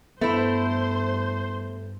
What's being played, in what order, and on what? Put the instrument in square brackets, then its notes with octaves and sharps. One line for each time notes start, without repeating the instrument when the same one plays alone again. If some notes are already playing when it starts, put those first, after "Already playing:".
[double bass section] G2 [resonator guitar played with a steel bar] A3 E4 [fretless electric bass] B3 [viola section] C5